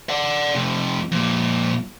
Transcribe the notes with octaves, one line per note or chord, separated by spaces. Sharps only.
D5 F#5
F2 C3
F2 A#2